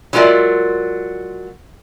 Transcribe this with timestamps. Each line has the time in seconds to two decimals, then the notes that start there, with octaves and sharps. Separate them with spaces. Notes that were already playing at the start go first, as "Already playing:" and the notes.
0.13 F#3 G#3 F4 A#4 D5 E5